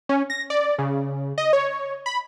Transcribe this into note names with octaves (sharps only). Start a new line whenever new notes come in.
C#4
A#6
D5
C#3
D#5
C#5
B5